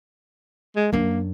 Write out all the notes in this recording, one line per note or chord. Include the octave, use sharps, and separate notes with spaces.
G#3
F#2 A#3 D4